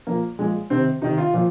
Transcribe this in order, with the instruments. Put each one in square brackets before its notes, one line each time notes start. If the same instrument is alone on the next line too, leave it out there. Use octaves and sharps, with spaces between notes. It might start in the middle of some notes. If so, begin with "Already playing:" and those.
[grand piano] A#2 F3 A#3
A#2 F3 G#3
C3 D#3 C4
C3 D#3 D#4
F4
A#2 F3